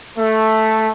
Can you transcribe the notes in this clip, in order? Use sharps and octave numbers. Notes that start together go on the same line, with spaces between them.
A3